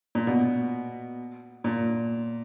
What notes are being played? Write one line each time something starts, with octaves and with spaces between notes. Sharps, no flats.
A#2
B2
A#2